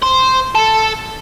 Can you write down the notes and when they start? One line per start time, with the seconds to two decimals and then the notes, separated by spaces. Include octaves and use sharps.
0.03 C5
0.55 A4